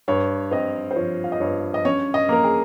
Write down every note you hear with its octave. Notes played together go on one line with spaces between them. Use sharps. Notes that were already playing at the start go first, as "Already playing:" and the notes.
G2 C#5
C4 D#5
C5
F3 C#5
F5
D#5
G2 C#5
D#5
C#4 C#5
D#5
A#3 A#4
G#4